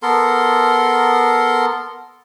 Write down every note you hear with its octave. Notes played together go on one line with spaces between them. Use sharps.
B3 A4 A#4 C6